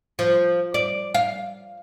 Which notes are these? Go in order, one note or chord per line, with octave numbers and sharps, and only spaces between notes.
F3
D5
F5